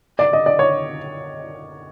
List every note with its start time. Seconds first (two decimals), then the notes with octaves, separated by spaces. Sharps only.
0.19 D5
0.33 D#5
0.46 D5
0.59 C#5